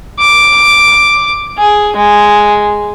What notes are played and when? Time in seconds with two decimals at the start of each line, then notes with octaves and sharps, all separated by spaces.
0.20 D6
1.58 G#4
1.96 G#3